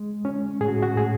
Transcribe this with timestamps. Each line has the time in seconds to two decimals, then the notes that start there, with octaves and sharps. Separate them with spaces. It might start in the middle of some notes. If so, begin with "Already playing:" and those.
Already playing: G#3
0.25 C#4
0.60 A2 G#4
0.68 F#4
0.83 F#4
0.96 A2 G#4